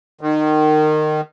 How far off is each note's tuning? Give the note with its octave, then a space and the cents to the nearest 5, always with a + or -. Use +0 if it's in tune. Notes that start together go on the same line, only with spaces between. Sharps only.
D#3 -25